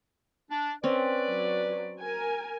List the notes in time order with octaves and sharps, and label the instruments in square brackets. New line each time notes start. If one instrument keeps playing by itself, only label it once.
[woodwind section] D4
[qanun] C4 C#4 [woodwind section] B4 D5
[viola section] F#3
A#4 G#5